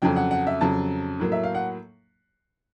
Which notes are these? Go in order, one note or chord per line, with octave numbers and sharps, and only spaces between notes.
F2 C#3 F#3 G5
F#5
F#5
E5
F2 C#3 F#3 A5
A2 F#3 A#3
E5
F5
F#5